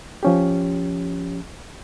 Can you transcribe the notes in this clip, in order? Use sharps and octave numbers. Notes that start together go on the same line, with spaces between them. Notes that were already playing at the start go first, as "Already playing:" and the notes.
F3 C#4 G4